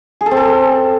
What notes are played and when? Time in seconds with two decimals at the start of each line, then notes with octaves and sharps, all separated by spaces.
0.21 G#4
0.26 A4
0.31 C4
0.37 A4